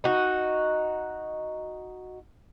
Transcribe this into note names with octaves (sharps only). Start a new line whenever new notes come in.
D#4 F#4